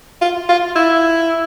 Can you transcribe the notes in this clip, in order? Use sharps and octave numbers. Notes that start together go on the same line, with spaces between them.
F4
F4
E4